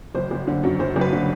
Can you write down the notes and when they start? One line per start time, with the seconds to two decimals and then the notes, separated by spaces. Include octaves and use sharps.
0.15 F#1 C5
0.31 F#1
0.47 D3
0.63 F#2
0.79 F#1 C5
0.96 F#1
1.01 B4
1.12 D3